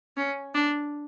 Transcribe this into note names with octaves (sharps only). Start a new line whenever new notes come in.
C#4
D4